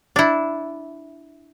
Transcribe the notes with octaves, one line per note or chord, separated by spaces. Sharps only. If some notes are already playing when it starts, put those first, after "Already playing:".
D4 E4